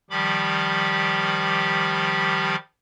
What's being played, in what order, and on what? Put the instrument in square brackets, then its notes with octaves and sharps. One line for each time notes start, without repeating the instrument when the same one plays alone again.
[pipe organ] D#3 F3 G3 G4 B5 D6